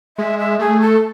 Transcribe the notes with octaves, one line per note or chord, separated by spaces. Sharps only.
G#3 E5
E5
A3 G#4
A4